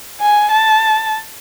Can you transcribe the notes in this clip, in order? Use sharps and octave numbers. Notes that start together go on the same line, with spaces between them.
G#5
A5